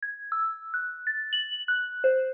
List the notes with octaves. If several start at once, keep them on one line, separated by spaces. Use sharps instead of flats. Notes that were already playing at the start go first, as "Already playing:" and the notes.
G#6
E6
F#6
A6
F#7
F#6
C5